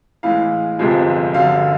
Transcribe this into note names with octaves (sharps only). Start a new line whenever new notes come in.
A2 E3 G#3 F5
G1 F2 C3 F3 G#3
G1 F#2 D3 F#3 F5